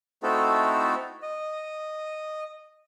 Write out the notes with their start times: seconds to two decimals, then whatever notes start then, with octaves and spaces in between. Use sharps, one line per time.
0.23 A3 C4 D#4 E4 F#4 A4
1.22 D#5